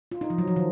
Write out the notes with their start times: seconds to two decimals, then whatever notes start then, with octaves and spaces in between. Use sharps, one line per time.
0.12 F4
0.21 D#4
0.30 F3
0.38 F#3
0.47 F3
0.56 D#3